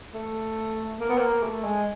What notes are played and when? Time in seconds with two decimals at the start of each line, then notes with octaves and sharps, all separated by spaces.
0.14 A3
1.00 A#3
1.09 B3
1.18 A#3
1.43 A3
1.64 G#3